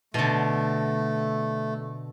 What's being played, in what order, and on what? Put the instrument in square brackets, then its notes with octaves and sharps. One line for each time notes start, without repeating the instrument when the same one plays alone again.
[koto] B2 D3 [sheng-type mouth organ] A3